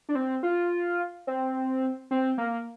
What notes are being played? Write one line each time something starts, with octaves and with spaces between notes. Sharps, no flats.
D4
C4
F4
C4
C4
A#3